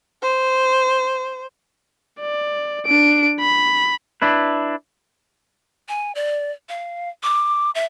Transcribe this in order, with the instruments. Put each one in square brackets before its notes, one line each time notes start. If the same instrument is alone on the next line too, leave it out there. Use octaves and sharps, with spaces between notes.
[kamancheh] C5
[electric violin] D5
D4 D7
B5
[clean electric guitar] D4 E4 B4
[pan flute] G#5
D5
F5
D6
E5